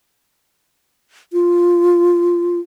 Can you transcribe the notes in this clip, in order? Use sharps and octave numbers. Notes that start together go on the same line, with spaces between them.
F4